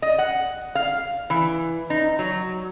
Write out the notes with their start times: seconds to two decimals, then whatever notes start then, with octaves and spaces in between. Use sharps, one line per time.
0.02 D#5
0.18 F#5
0.75 F5
1.30 E3
1.90 D#4
2.19 F#3